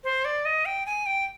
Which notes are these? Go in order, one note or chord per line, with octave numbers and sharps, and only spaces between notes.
C5
D5
D#5
G5
G#5
G5